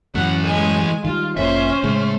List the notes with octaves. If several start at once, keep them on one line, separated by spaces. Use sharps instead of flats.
F#2 E3 A3 F#5
G#3 G#5
D#3 G3 F4
F1 A#2 C#4 C5 E5
A2 C#3 G#3 A3